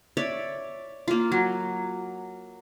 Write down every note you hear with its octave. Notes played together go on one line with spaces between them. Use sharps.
C#5 D5 E5
A#3 F4
F#3